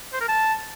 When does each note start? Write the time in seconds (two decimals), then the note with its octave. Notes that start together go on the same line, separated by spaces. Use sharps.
0.13 C5
0.21 A#4
0.28 A5